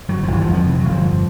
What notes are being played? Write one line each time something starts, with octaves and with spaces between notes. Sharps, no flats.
G1 F#3
F3
G1 E3
F3
F2
F3
C3 E3
F#3
G1
F3
F2